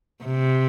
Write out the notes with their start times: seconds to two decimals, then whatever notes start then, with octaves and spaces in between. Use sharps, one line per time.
0.25 C3